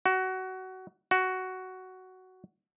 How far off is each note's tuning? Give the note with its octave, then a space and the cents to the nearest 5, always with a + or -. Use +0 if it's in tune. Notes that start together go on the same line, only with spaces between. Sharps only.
F#4 +20
F#4 +10